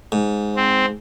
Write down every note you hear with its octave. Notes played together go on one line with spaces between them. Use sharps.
G#2
C4